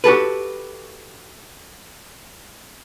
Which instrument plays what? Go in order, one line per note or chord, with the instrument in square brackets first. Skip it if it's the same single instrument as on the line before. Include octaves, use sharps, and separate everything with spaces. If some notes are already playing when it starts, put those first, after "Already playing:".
[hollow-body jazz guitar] F#4 G4 A4 B4